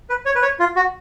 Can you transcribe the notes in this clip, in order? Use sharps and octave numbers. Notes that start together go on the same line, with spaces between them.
B4
C#5
B4
C#5
F4
F#4